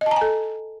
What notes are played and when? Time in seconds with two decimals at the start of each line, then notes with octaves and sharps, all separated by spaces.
0.01 D#5
0.06 A5
0.11 A#5
0.16 G#5
0.21 A4